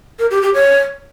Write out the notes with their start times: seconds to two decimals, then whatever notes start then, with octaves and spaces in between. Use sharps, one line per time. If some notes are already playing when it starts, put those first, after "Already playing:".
0.19 A#4
0.31 G4
0.42 G4
0.54 C#5